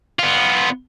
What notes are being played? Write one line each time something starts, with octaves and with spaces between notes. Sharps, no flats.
B3 F4